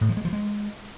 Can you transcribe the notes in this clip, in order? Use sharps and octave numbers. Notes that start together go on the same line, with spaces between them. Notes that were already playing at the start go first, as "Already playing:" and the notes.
A2
F3
G#3
F3
G#3